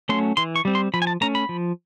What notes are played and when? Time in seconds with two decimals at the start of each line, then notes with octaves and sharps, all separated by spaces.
0.09 F#3 A3 C#4 C6
0.37 E3 C6
0.56 C#6
0.65 G3 C4
0.75 C6
0.94 F3 B5
1.02 G#5
1.07 A5
1.21 A3 C#4 A#5
1.35 B5
1.49 F3